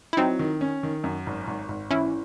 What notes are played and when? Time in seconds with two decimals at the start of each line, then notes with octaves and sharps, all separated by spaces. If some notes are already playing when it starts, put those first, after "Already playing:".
0.13 E4
0.17 F#3 C4 D#4
0.39 D#3
0.61 C#4
0.83 D#3
1.04 F#2
1.26 G#1
1.47 G#1
1.68 G#1
1.90 E3 C#4 E4